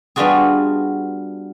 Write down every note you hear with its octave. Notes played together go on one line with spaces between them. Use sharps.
G3 B3 D4 F4 F#4 G#4